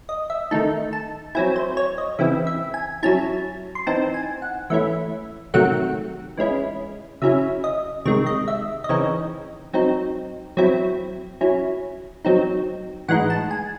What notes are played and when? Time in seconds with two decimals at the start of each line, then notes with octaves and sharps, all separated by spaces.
0.09 D#5
0.30 E5
0.51 D#3 A3 D#4 A5
0.93 A5
1.35 F#3 C4 E4 G#5
1.56 C5
1.77 C#5
1.98 D#5
2.19 C#3 E3 C4 E4 E5
2.47 E5
2.74 G#5
3.03 F#3 C#4 E4 A5
3.75 C6
3.87 E3 C4 D#4 A5
4.14 G#5
4.42 F#5
4.70 E3 A3 C#4 E4 E5
5.54 C3 D#3 F#3 A3 F#5
6.37 E3 G#3 C#4 E4
7.22 C#3 F#3 C#4 E4 E5
7.64 D#5
8.05 C3 D#3 G#3 C#5
8.26 D#5
8.48 E5
8.84 D#5
8.89 C#3 E3 C4 D#4 C#5
9.73 F#3 C4 D#4
10.57 F#3 C4 E4
11.41 F#3 C#4 E4
12.25 F#3 C4 D#4
13.08 A2 E3 G#3 D#4 F#5
13.30 A5
13.51 G#5